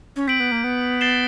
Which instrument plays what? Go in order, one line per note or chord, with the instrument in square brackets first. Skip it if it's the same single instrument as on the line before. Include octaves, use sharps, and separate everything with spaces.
[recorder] C#4
[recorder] C4 [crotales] G6 B6 D7 F#7
[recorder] B3
A#3
B3
[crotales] A6 C7 E7 G7